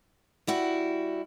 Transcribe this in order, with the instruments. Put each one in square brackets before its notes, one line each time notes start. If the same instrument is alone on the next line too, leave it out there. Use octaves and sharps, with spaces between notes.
[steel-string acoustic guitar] G3 E4 F#4